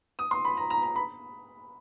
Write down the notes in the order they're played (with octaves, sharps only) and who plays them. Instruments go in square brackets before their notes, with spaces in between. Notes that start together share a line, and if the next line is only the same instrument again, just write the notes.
[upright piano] D#6
C6
B5
A#5
A#5
A#5
B5